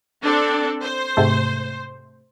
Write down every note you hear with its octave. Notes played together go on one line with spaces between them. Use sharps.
C4 D4 A4
C5
G#2 C3 A3